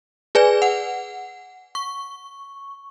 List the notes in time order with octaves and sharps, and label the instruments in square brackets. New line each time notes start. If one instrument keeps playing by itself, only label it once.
[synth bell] G#4 B4 D5 G#5
F#5
C#6